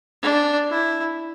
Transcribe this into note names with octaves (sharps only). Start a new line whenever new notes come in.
D4
E4